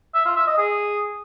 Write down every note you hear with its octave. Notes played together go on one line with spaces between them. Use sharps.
E5
F4
E5
D#5
G#4